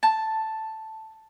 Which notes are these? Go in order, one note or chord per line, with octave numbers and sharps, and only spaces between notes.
A5